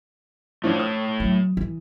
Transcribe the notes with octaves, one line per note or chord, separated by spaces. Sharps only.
E3 F3 A3 D4 C#5
D#6
F#3
E3